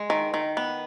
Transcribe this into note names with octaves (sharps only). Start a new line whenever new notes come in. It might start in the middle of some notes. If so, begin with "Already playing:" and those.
Already playing: G#3
D#3
D#3
B3